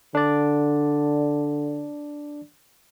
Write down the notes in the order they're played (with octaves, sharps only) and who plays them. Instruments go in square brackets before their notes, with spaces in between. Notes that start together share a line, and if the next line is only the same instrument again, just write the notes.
[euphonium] D3 [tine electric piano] D4 D5